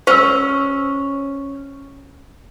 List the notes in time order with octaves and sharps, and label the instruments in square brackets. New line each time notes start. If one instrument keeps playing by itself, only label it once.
[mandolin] C#4 [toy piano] C5 E6